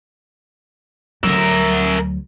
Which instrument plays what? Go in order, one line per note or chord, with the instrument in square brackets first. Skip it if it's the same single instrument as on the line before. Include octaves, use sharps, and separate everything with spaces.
[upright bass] D2 F#3 [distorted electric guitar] A#4 E5